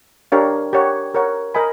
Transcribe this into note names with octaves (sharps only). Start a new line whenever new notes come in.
D4 G4 A#4 C#5 F5
G4 A#4 C#5 F#5
G4 A#4 C#5 F#5
A#4 D#5 G#5 B5